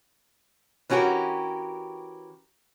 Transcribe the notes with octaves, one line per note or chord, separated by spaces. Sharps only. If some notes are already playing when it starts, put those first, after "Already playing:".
E3 C#4 F#4 G4 A#4